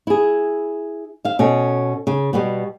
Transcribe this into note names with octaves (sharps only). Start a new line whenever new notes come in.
E4 G#4
E5 F5
B2 C#4 A4
C#3
B2 G3 B3